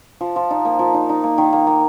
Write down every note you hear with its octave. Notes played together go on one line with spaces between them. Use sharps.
F3
F3
D#4
A#3
F3
D#4
D#4
A#3
D#3
A#3
A#3